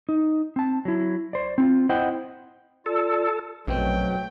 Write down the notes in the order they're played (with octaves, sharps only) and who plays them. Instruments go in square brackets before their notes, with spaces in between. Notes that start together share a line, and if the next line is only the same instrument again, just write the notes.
[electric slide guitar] D#4
C4 A5
F#3 E4
C5 D5
C4 D#4 F4
E4 C5 D#5 F#5 G5
[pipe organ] F4 D5 [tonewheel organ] A4
[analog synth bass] A#1 [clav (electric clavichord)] F#2 B2 C4 [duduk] F#3 [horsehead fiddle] A3 G5